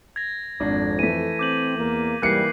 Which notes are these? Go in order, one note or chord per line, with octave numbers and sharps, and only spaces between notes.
G#6 A#6
G#1 F2 D4
E3 A3 B6 D#7
C4 D6 G6 F#7
E2 A#3
G#2 C3 E3 G3 A#3 F#6 C7 C#7